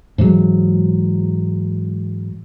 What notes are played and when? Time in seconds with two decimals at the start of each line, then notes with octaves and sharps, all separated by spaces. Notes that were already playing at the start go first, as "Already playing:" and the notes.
0.18 G#2 E3 F#3 G#3